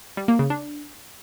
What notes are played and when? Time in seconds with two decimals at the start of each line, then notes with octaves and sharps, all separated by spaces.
0.17 G3
0.28 A#3
0.39 C#3
0.50 D4